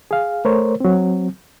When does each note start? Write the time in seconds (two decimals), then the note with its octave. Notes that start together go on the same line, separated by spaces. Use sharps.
0.11 G#4 F5
0.45 A3 A#4 C5 C#5
0.80 F#3 C4